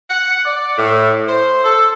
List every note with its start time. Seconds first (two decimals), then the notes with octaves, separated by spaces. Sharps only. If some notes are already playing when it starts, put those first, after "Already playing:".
0.10 F#5
0.46 D5
0.78 A2
1.27 C5
1.63 A4